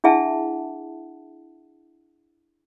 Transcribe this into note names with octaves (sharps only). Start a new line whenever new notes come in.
D4 E4 G#4 E5 F#5 A5